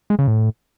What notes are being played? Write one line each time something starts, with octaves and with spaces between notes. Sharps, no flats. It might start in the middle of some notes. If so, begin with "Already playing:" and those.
G#3
C#3
A2